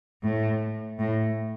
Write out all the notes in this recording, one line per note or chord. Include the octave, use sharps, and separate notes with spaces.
A2
A2